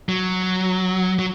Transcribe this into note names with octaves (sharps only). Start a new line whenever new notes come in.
F#3
F#3